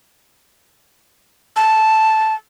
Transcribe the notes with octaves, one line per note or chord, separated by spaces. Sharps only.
A5